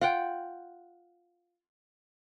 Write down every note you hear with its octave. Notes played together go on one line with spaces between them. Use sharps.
F4 F#5 G5